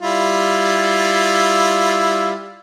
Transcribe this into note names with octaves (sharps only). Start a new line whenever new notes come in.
G3 E4 F4